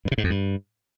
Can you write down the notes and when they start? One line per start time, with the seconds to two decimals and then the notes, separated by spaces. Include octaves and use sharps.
0.05 G2
0.11 C3
0.18 G#2
0.24 F2
0.30 G2